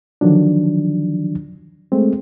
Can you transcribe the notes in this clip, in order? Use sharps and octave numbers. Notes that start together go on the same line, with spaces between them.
D3 D#3 F3 F#3 D4
G#3 A3 C4